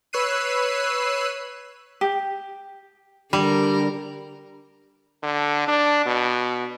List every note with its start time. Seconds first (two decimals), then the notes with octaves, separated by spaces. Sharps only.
0.13 B4 C#5 E6 F#6 C7 D#7
2.01 G4
3.33 D3 G3 A#4
5.22 D3
5.68 D4
6.06 B2